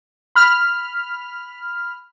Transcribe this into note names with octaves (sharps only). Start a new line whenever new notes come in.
B5 F6